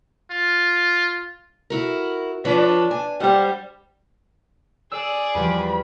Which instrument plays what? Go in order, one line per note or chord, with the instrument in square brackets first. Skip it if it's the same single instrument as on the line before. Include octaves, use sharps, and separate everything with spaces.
[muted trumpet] F4
[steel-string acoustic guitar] E4 F#4 A#4
[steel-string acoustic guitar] F3 B4 C#5 [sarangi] D4
[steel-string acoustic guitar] G#5
[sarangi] G3 [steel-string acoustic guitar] C5 F#5
[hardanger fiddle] G#4 D5 [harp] E6
[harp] E2 F3 G3 [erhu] B5